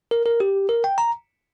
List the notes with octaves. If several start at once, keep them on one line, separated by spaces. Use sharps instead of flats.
A#4
A#4
G4
A#4
G5
A#5